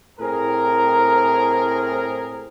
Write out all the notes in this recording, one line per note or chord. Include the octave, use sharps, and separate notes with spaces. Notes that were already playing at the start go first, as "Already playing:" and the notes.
A2 C4 G#4 A#4